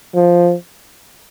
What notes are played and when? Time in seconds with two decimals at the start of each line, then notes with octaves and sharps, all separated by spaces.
0.15 F3